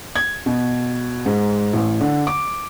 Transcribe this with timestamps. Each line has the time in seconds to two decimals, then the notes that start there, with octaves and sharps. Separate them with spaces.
0.16 G#6
0.46 B2
1.26 G#2
1.73 A1
2.01 D3
2.27 D6